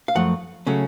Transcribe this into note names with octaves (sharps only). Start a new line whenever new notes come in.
F5
F#2 F3 A3 F#5
C#3 F#3 A3 C#4